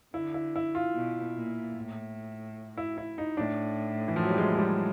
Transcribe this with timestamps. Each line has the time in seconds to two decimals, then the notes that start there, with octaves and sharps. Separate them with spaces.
0.14 D3 E4
0.34 E4
0.56 E4
0.75 F4
0.95 B2
1.36 A#2
1.76 A2
2.77 E4
2.98 E4
3.18 D#4
3.37 A2 D4
4.08 E3
4.16 F3
4.23 F#3
4.31 G3
4.38 G#3
4.55 G#3
4.59 G3